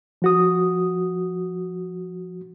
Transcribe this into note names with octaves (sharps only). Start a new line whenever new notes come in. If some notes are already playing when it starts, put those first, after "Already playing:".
F3 F#4 D#6